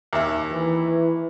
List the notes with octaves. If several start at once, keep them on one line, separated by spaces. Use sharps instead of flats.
D#2 E5
E3